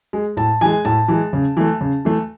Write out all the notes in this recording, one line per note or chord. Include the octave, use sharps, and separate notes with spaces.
G#3
A2 A5
E3 G#3 G#5
A2 A5
E3 G#3
C#3
E3 A3
C#3
E3 A3